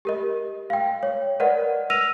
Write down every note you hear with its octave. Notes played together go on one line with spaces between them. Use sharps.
G4 A#4 D#5
F5 G5
C#5
A#4 B4 D5 D#5 F#5
E6 F6 A#6 D#7 F7